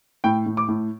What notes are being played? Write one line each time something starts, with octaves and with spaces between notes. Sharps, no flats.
A2 G5
A2
D6
A2